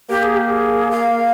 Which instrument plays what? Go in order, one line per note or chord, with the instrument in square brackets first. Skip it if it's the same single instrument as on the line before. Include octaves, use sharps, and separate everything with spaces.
[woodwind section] A#3 [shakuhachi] G4
[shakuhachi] G#4
G4
G#4
F5